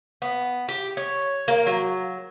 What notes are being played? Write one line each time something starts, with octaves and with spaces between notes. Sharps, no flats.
B3
G4
C#5
A#3
F#3